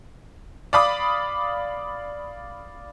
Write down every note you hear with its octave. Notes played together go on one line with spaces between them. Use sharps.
D5 F5 B5 D6 D#6